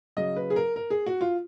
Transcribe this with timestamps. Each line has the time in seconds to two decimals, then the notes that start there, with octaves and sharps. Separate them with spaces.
0.17 C#3 F#3 D#5
0.36 B4
0.50 G#4
0.56 A#4
0.76 A#4
0.90 G#4
1.06 F#4
1.21 F4